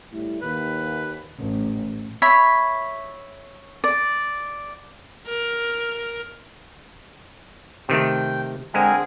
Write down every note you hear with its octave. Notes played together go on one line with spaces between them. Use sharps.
A2 G3 E4
D#2 B4
A1
C#5 E5 B5
D5
A#4
C3 D#3 A3 G5
D3 G#3 C4 G#4 A#4 G#5